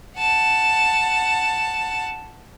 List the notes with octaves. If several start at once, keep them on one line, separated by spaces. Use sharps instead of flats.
F#5 A5